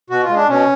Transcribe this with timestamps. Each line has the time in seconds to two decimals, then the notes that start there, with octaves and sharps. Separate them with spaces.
0.10 B2 F#4
0.23 F4
0.29 G#3
0.36 D4
0.49 B2 C#4